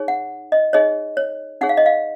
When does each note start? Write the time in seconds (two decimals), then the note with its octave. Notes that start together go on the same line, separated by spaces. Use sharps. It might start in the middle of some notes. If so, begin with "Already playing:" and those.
Already playing: D#4 G#4 C#5
0.08 F#5
0.52 D#5
0.73 D#4 G#4 C#5 D#5
1.17 C#5
1.61 D#4 G#4 C#5 F#5
1.69 F5
1.77 D#5
1.86 F5